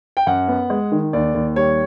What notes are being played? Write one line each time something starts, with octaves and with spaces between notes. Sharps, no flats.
G5
F#2 F#5
B3
G#3
D#3
D#2 D5
D#2
G3 C#5